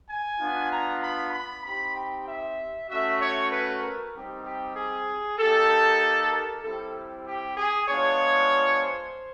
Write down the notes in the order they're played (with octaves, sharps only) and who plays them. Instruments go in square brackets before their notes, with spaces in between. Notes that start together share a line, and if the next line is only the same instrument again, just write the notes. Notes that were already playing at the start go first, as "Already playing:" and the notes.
[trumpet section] G#5
B3 D4 F4
A#5
B5
B5
C4 D#4 G4 B5
G5
E5
A3 C#4 F#4 E5
C#5
B4
A#4
G3 C4 D#4 G4
G4
G#4
A#3 D#4 G4 A4
A#4
G3 C4 E4 G4 A4
G4
G#4
G#3 B3 D4 F4 C#5
C5